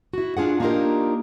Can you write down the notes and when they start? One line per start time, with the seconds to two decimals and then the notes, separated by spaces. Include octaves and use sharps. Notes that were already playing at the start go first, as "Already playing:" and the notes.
0.13 E4 F#4
0.37 D4 F4 G#4 F#5
0.60 A#3 D4 D#4 F4 G4 A#4